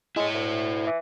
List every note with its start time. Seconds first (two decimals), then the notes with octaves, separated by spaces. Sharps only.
0.16 G#3 E4 C#5
0.34 D2
0.87 E3